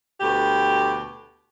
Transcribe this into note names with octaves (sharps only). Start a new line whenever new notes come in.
D2 B2 G4